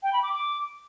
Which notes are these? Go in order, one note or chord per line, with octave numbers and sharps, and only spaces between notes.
G5
B5
D6
D6